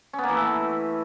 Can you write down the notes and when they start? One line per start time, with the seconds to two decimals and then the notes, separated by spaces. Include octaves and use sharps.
0.13 C#4
0.18 B3
0.23 A#3
0.28 E3
0.33 A3